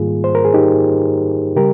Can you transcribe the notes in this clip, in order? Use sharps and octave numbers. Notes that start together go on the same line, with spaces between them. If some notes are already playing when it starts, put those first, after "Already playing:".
Already playing: G#2 D#3 G3 A#3 F4 G#4
C5
A#4
G#4
D#4 G4
C#3 G3 G4 A#4